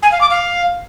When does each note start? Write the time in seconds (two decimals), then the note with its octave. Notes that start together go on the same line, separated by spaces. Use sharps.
0.03 G#5
0.12 F5
0.21 D6
0.30 F5